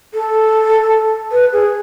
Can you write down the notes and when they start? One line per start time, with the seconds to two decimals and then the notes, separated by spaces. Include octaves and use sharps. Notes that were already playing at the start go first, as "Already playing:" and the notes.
0.14 A4
1.32 B4
1.53 G#4